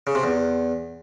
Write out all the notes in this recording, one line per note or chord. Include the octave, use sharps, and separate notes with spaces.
C#3
C3
E2